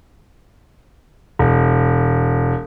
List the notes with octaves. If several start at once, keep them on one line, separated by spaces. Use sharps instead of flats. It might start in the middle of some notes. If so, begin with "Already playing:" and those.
E1